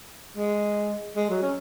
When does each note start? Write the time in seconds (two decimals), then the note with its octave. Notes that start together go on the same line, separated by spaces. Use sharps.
0.37 G#3
1.16 G#3
1.30 F#3
1.42 C#4